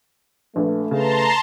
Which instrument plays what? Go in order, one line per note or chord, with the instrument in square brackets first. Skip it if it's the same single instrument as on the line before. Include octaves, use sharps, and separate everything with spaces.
[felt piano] A#1 [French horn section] A3 B4
[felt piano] C#3 [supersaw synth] A5 A#5 C6